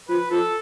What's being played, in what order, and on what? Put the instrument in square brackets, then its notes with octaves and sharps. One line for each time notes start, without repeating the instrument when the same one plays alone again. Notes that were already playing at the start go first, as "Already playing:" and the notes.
[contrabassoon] F3 [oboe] B4
[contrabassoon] F3 [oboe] A4